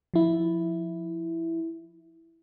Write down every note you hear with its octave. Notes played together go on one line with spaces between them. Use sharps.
F3 E4